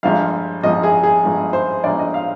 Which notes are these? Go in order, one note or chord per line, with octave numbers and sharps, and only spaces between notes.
G1 G2 F3 G#3 F5
G1 G2 F3 G#3 D#5
G#4
G#4
G1 G2 F3 G#3
C5
G1 G2 F3 G#3 D5
D#5
F5